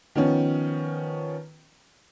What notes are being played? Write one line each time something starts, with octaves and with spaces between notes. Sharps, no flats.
D#3 F3 B3 C#4